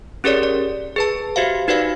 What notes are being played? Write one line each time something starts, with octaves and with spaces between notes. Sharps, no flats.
C#4 G4 G#4 A#4 C#5 D5
D5
G#4 B4 A5
F#4 G4 C5 E5 F5
D#4 F#4 B4 C5 D5 F5